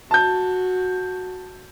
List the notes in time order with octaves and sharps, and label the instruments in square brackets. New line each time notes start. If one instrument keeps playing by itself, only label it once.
[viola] F#4 [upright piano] A5 G6